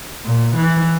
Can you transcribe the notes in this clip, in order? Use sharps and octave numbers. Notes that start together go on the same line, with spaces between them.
A#2
E3